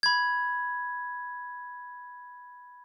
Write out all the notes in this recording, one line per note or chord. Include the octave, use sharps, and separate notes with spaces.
B5 G#6